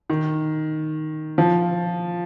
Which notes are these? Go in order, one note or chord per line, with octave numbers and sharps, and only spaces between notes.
D#3
F3